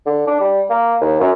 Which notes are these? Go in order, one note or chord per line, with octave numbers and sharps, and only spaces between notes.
D3
D4
G3
A#3
D#2
F#2